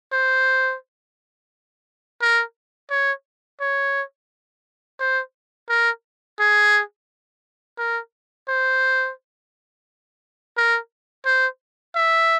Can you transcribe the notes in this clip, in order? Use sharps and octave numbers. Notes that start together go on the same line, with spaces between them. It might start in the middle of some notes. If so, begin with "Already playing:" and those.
C5
A#4
C#5
C#5
C5
A#4
G#4
A#4
C5
A#4
C5
E5